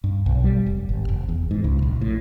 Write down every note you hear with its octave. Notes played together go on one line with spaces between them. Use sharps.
G2
B1
G3
F1
G#1
F1
E2
G#2
C#2
A#1
A2